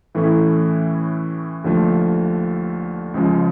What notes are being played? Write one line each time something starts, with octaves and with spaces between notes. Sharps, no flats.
A2 E3 A3 C#4 E4
D#2 D3 F3 A3
C#2 C#3 F3 G#3